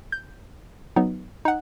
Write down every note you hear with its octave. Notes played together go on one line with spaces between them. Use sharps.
G6
F#3 B3 D#4
D#4 F#5